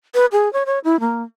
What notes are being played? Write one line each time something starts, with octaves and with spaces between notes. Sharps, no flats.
B4
G#4
C#5
C#5
E4
A#3